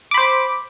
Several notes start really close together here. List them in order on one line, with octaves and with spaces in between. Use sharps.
D6 B5 C5